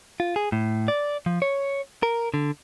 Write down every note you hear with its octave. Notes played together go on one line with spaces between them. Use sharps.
F4
G#4
A2
D5
F3
C#5
A#4
D3